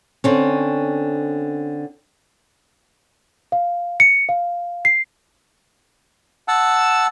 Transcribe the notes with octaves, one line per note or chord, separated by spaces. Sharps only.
D3 C4 C#4
F5
C#7
F5
C7
F#5 A5 E6